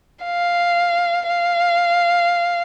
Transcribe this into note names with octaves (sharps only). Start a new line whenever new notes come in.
F5
F5